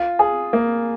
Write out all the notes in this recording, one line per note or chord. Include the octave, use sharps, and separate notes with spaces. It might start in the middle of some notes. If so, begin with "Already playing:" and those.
Already playing: F4
G#4
A#3